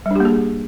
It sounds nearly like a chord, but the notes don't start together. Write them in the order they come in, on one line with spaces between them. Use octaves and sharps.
G3 D4 G4 A#3 G#4